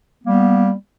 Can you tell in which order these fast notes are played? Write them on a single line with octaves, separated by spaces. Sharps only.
B3 A#3 G3